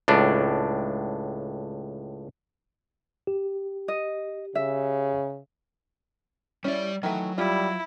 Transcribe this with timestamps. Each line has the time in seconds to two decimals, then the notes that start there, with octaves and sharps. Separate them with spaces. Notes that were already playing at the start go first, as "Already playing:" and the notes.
0.08 C#2 A2 D4
3.27 G4
3.88 D#5
4.55 C#3 E5
6.64 G3 C#4 E4 D5
7.03 D#3 E3 F#3 A3
7.38 G3 E4 F4